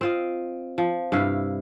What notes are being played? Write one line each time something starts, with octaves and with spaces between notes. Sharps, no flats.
C4 F4 D#5
F3
G2 C3 E4 F5